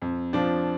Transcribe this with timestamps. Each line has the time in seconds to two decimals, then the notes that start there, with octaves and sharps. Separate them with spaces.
0.02 F2
0.33 F3 D4